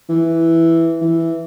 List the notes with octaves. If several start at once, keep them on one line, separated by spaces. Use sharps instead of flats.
E3
E3